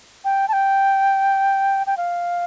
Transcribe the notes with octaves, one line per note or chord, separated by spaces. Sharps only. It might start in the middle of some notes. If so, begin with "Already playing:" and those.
G5
A5
G5
G5
F5